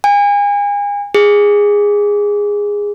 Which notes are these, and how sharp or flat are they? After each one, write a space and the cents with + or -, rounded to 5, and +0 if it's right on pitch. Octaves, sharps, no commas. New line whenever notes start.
G#5 -35
G#4 -15